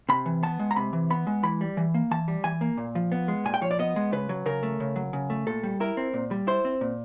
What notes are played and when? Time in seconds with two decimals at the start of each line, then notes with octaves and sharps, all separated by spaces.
0.09 C3 B5
0.26 E3
0.43 B3 A5
0.59 G#3
0.71 A#5
0.76 C3 B5
0.93 E3
1.10 B3 B5
1.27 G#3
1.43 E3 B5
1.61 G3
1.77 E3
1.94 A#3
2.11 E3 A5
2.28 G3
2.44 E3 G#5
2.61 A#3
2.77 A#2
2.95 F3
3.12 B3
3.28 G#3
3.45 A#2 G#5
3.54 G5
3.61 F3 C#5
3.71 D5
3.79 B3 D#5
3.96 G#3
4.12 C#3 B4
4.29 F#3
4.46 C#3 A#4
4.63 A3
4.80 C#3
4.96 F#3
5.13 C#3
5.30 A3
5.47 A#2 A4
5.63 G3
5.80 E4 A#4
5.97 C4
6.14 A#2
6.31 G3
6.47 E4 C5
6.65 C4
6.81 A#2